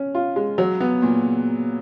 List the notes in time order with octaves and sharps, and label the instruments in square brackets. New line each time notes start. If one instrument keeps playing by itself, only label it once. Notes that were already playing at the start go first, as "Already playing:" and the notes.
Already playing: [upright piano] C#4
F4
G#3
F#3
B3
A#2